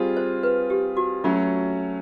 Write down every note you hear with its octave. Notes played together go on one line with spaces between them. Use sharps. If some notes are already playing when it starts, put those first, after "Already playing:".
Already playing: G3 C4 F4 G#4
C5
B4
G4
F#4
F#3 A3 C#4 F4